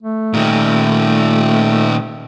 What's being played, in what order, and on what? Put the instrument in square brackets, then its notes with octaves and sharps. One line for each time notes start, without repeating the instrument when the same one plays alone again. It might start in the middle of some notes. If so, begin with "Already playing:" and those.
[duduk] A3
[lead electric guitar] A#2 D#3